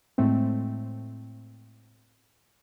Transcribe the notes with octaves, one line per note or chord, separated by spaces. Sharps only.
A2 G#3 A3 C4